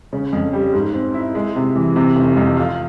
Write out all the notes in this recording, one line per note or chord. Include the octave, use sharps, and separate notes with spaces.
C#3
F2
G3
G#2
C4
E4
G#3
C3
E3
C3
F1
F2
F4